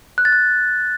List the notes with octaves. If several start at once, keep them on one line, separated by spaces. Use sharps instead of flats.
F#6
A6
F#6